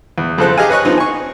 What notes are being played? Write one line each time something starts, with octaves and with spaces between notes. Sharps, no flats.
E2
F2 C#3 A4 C5 F#6
G4 G#4 D#5 F5 G#5
B4 C#5 D#5 C#6 F#6
F3 B3 C4 D#4
G#5 C#6